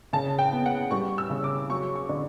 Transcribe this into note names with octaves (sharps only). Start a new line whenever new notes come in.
C#3 A5
G5
B3
F#5
G3 C#6
E6
C#3
D6
F#3 C#6
C#6
D3